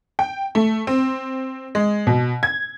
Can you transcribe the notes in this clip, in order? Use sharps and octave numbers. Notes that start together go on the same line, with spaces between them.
G5
A3
C4
G#3
B2
G#6